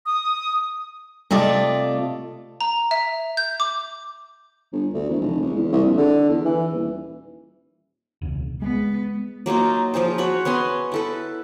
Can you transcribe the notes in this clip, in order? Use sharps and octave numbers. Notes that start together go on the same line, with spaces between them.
D#6
C3 A3 F4 D5 D#5
A#5
E5
G6
D6
G1
D2
E1
F1
C#2
E2
C2
A#1
D3
E2
E3
D#1
E1 C#2
G#3 B3
F#3 A#3 D#4 F4
F3 F4 G#4 C5
F#4 C#5 B5
B3 C#4 G#5 C6
E4 A4 B4